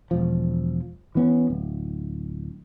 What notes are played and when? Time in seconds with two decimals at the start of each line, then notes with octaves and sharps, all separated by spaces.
0.11 E1 F3
1.15 E3 B3 C#4
1.50 D1